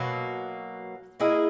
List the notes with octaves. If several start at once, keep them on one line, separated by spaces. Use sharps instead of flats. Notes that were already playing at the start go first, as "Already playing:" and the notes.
Already playing: B2 F#3 A#3
A#3 E4 G#4 D#5